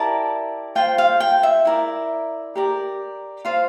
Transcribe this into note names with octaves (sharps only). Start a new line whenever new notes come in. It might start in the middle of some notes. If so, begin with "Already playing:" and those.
Already playing: E4 G4 A#4 D5 A5
F4 C5 G5
F5
G5
E5
E4 A#4 D5
G4 A#4 D5
F4 C5 F5